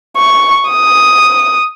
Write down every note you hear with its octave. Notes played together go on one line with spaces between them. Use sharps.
C#6
D#6